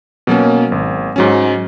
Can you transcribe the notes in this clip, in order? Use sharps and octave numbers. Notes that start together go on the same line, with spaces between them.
B2 F#3 A#3 C#4
G#1
G#2 F#3 C#4